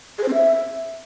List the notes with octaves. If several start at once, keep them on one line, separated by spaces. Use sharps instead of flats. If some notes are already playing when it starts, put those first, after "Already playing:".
G#4
C5
C4
E5